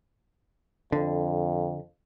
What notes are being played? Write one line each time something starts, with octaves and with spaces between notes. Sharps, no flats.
F2 D3